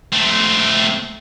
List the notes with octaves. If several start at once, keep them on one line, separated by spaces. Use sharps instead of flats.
A3 C4